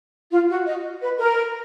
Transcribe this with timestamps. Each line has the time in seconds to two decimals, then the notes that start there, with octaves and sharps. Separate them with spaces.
0.32 F4
0.50 F#4
0.67 D#5
1.02 B4
1.19 A#4